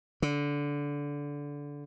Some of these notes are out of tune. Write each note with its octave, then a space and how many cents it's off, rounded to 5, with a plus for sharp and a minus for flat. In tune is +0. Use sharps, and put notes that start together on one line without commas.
D3 -20